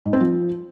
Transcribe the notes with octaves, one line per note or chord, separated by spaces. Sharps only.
G#2
C4
F3